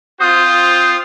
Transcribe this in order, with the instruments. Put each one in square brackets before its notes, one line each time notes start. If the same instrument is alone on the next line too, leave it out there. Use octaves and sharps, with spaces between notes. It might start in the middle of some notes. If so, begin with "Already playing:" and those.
[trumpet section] C4 F4 [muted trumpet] C5 [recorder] D#6